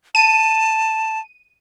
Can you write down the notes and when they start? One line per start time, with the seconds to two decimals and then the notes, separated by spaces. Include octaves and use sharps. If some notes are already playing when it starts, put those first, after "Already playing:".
0.15 A5 D#7